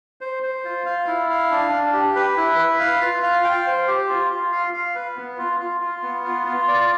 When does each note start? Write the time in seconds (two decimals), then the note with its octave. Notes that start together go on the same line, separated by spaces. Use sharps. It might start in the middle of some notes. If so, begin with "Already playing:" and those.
0.21 C5
0.43 C5
0.65 F4
0.86 F5
1.07 E4
1.30 F5
1.51 D4
1.72 D4
1.93 G4
2.15 B4
2.37 E4
2.59 B4
2.80 F5
3.01 F4
3.23 F5
3.44 G5
3.67 C5
3.87 G4
4.09 F4
4.30 F4
4.52 F5
4.73 F5
4.95 B4
5.16 B3
5.38 F4
5.60 F4
5.81 F4
6.03 B3
6.25 F4
6.46 F4
6.68 D5